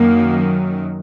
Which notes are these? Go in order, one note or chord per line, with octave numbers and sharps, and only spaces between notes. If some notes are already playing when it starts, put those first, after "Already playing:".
Already playing: F#2 D#3 F#3 A#3